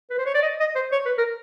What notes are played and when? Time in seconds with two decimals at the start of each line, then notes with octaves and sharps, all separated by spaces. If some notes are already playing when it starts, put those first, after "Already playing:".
0.10 B4
0.18 C5
0.26 C#5
0.34 D5
0.42 D#5
0.60 D#5
0.75 C5
0.92 C#5
1.05 B4
1.18 A#4